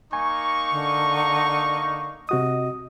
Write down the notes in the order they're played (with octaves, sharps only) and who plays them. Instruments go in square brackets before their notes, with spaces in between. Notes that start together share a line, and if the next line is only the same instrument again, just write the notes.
[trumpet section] A#3 D#4 C#6 [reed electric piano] G#5
[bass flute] D3
[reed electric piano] C3 F#4 D#6 [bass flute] D#5